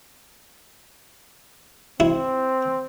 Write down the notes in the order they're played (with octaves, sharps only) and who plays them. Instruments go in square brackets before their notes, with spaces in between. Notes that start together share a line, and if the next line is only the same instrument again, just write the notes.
[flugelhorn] C4 [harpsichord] E4